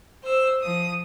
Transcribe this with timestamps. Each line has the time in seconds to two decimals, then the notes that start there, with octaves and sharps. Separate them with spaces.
0.23 C5 E6
0.61 F3 D#6